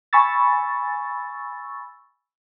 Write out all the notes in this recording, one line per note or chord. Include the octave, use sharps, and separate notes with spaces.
G#5 B5 C#6 E6 A6